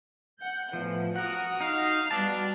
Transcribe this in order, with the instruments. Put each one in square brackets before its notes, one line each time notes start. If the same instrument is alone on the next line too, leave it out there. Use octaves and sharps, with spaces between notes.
[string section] F#5 G6
[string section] E2 A2 [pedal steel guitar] F3
[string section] F#4 D#6 [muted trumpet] A#4 [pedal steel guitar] F#5
[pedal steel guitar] D#4 [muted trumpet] F5
[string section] G3 B3 F#4 [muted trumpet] D4 [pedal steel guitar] A5